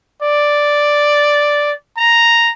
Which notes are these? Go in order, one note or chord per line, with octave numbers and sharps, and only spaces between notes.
D5
A#5